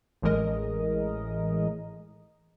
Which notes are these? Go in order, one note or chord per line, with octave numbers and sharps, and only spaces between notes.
A1 A2 E3 G#3 A#4 D#5